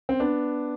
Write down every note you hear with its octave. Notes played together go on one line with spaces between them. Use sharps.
C4
B3 D4